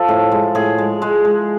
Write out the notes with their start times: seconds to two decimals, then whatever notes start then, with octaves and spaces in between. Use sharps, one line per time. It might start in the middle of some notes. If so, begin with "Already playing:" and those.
Already playing: F3 A4
0.08 A2
0.31 G#3
0.55 A2 G#4
0.78 G#3
1.02 G#3
1.25 G#3